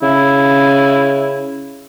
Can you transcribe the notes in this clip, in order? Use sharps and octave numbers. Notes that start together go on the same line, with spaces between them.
C#3 E4